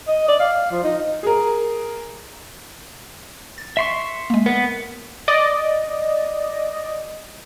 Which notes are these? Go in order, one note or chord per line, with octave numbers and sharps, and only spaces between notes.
D#5
D5
F5
F3
D#4
G#4 A#4
A6
E5 C6 C#6
G#3 A#3
B3 A#4
D5 D#5